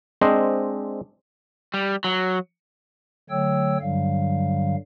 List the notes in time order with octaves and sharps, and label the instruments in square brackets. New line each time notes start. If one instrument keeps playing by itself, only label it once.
[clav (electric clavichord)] G#3 C4 D4 C5 D#5
[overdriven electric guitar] G3
F#3
[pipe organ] D3 F#3 A3 C#5 G5 E6
G2 D3 F#3 G3 F5